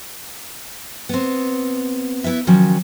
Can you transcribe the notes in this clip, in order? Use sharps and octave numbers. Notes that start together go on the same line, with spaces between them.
B3 C4
B3 E4 B4 E5
D#3 F3 F#3 C#4